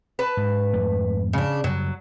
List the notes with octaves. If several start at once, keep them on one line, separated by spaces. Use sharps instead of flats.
B4 A5
G#2
F2 G#2 A3
C#3 D4
F#2 C#3 F#3 G3